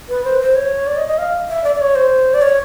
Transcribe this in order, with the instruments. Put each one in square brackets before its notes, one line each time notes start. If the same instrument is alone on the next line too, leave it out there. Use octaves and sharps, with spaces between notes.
[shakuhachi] B4
C5
B4
C5
C#5
D5
D#5
D#5
F5
E5
D5
D5
C#5
C5
D5
C#5